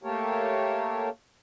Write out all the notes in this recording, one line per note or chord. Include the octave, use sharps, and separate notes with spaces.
A3 A#3 G4 A4 A#4 C#5